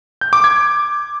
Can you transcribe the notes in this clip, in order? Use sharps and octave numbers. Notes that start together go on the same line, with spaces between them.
G6
D6
G#6